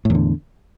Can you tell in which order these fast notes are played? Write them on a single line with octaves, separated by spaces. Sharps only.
A2 E2 D3